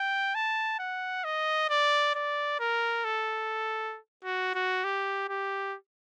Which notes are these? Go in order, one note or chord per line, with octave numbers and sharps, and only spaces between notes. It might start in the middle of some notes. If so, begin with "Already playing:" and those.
Already playing: G5
A5
F#5
D#5
D5
D5
A#4
A4
F#4
F#4
G4
G4